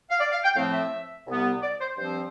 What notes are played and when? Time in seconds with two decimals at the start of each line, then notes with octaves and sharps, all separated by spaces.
0.11 F5
0.20 D5
0.32 F5
0.44 G5
0.55 A2 F3 A3 C4 F5
0.73 E5
1.27 C2 C3 G3 B3
1.62 D5
1.80 C5
1.97 G2 F3 C4 C5